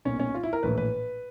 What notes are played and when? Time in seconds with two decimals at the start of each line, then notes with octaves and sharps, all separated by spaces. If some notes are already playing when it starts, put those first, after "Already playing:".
0.05 B1 A#2 C#4
0.20 C#4
0.34 F4
0.43 E4
0.53 A#4
0.63 A#1 A2 E3 B4
0.78 B4